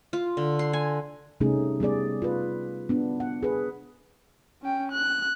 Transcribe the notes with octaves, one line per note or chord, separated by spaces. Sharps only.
F4
D3
C6
G#5
C3 G3 A3 C#4 D#4 G#4
G3 B3 G#4 D5
F4 B4
B3 D4
F#5
G#4 B4
C#4 G5
F#6